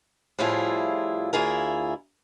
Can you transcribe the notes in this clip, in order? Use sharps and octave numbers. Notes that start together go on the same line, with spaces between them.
A2 F3 G3 E4 F4 G#4
D2 E4 F4 G#4 A#4